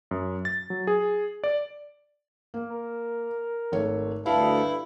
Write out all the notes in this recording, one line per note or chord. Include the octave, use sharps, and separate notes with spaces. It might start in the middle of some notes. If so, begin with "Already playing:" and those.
F#2
A6
F#3
G#4
D5
A#3
A#4
G#1 A3 C#5
D2 G2 E4 A4 F5